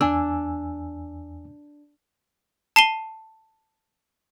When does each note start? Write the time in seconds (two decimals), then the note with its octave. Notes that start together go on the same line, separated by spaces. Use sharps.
0.01 E2 D4 G#5 E6
2.76 A5 C7 D#7 G7